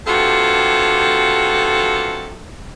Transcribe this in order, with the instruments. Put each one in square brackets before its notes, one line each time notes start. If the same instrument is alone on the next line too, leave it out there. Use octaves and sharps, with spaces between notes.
[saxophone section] G2 C3 F4 F#4 A4